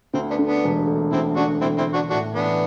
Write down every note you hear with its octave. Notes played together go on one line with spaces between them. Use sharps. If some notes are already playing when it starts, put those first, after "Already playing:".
D2 C4
B3 D4
D3
B3 D4
E1
A3
D2 C4 E4
D3 D4 F#4
E1 C4 E4
C4 E4
A3
D4 F#4
A2 D4 F#4
E3 B3 D4